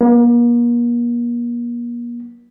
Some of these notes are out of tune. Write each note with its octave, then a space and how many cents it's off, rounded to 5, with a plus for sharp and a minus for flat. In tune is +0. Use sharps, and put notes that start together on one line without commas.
A#3 +40